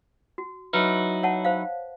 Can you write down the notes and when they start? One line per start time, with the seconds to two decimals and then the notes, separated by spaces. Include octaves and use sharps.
0.38 F#4
0.73 F#3 D#4 E4 B4
1.23 C#5 F#5 A5
1.45 C5 F5